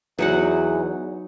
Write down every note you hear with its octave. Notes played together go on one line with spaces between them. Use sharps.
E2 F#3 D#4 F#5